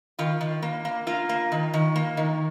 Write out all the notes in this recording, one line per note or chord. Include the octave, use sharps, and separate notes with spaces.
D#3 F4
D#3
A#3
A#3
A#3 F4
A#3
D#3
D#3
A#3
D#3